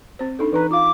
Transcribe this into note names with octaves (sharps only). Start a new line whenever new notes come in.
C4 C5
D4 D#4 A4
E3 D#4 B4 A#5
F4 F5 D6